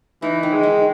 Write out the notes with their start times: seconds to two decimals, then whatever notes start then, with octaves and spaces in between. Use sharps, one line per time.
0.22 E3 D#4
0.43 D#3
0.53 G#3
0.63 D#3